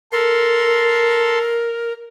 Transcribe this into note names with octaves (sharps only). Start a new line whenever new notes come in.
A4 A#4 C6